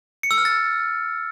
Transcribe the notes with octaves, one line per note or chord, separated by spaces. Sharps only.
C#7
E6
F6
A6